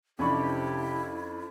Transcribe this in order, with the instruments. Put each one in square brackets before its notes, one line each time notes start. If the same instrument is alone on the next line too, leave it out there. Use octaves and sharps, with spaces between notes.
[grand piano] F2 D4 C#6 [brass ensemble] C3 G4 [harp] C#4 B5 [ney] E4